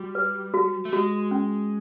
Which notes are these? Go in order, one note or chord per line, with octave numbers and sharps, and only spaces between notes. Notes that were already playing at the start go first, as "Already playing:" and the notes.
Already playing: G3 F#4
B4
F#4
A3
G#3 F#4
C#4